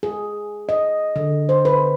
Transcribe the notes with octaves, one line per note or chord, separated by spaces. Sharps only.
G#4
D#5
D3
C5
B4